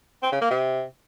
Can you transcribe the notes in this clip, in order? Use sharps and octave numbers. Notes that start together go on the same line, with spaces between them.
C4
C#3
A#3
C3